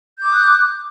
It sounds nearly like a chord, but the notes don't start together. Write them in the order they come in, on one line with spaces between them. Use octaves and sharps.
G6 D6 D#6 F#6